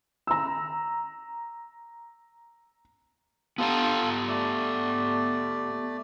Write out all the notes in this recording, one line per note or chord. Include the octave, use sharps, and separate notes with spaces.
A#5 E6
B3 F4 G4 A4 A#5
A3 D5